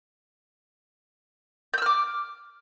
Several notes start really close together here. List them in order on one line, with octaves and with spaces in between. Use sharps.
G6 E6 F6 D6